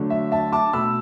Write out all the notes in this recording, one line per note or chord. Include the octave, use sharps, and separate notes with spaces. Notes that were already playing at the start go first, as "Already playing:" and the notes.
Already playing: D3 F#3 A3
E5
E5 A5
A5 D6
B2 A3 B5 E6